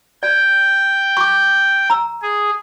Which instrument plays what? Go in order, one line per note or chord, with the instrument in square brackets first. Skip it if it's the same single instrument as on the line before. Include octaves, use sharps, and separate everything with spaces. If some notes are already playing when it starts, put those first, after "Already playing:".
[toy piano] D5 [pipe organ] G5
[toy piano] C#6 D6
A#5 E6
[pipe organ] G#4